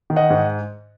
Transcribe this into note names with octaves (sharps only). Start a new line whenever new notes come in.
D#3
D#5 F#5
G#2